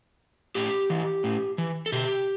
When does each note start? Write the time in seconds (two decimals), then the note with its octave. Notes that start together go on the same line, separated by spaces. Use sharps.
0.55 A2 G4
0.90 E3
1.24 A2
1.58 E3
1.86 A4
1.92 B2 G4